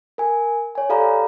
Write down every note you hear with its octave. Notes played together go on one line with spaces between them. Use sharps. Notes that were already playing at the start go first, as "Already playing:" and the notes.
A#4 G#5
C#5 G#5
G4 A4 D5 F5 A#5 B5